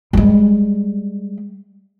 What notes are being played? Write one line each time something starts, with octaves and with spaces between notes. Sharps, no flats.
G3 G#3